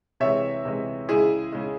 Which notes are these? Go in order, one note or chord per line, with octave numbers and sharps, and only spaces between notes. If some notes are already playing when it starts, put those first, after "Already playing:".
C3 E3 G#3 C#5 E5
C3 E3 G#3
C#3 G#3 E4 G#4
C#3 G#3